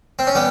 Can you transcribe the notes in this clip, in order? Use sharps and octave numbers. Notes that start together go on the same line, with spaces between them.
C4
C#4
G3 B3